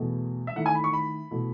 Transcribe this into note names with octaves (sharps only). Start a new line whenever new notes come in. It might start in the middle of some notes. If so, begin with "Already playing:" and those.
Already playing: E2 B2 A3 E4
E5
D#3 A3 E4 F#5
G#5
B5
C#6
B5
B2 A3 E4